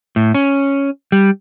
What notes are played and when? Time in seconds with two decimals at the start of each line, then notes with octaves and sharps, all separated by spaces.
0.16 A2
0.34 C#4
1.12 G3